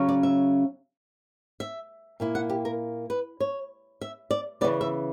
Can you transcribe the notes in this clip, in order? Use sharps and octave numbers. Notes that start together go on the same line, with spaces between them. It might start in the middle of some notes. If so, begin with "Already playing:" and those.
Already playing: C#3 F#3 C#4
D5
E5
E5
A#2 A#3 E4
F#5
G4
A#4
B4
C#5
E5
D5
C#3 E3 B3 D5
E5